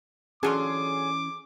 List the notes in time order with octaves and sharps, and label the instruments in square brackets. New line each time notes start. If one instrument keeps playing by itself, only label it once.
[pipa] D3 F#3 F4 [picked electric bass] E3 C#4 [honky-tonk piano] G#4 [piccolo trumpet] D6